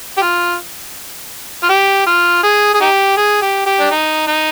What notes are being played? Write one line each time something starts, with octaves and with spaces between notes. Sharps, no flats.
G4
F4
F4
G4
F4
G#4
G#4
D#4 G4
G#4
G4
G4
D4
D#4
D#4